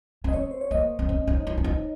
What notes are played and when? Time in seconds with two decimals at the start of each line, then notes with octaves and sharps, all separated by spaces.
0.24 C#4
0.28 D#5
0.33 C4 C#5
0.51 C5
0.61 C#5
0.71 A#3 D#5
0.99 C4
1.09 C#4
1.27 D#4
1.47 D#4
1.58 C#4
1.64 D#4